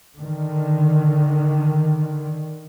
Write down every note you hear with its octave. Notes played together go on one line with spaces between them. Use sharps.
D3 D#3